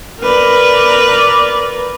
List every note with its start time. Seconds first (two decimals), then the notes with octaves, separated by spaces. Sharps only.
0.21 A#4 B4 D5